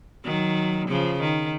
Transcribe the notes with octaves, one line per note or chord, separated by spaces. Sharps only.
D#3 F#3
C#3 F3
D#3